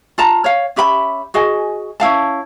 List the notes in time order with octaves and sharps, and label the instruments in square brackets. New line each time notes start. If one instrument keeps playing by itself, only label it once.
[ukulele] F4 A5 A#5
C#5 F5
C#4 G4 E5 B5
F#4 G#4 D#5 G#5
C#4 E4 F5 A5